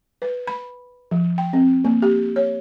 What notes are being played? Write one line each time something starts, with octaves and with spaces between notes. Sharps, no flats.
B4
B5
F3
G5
C4
A#3
G4
C#5